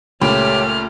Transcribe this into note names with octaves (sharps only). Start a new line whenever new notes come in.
C#2 A#2 A3 G4 C#5 B5 F6